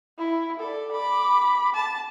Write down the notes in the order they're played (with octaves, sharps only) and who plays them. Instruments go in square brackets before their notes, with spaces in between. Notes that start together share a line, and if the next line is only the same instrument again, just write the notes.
[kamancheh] E4
A4 D5
B5 D6
A5